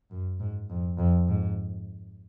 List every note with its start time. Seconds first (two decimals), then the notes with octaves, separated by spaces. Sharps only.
0.11 F#2
0.40 G#2
0.70 F2
0.98 F2
1.28 G#2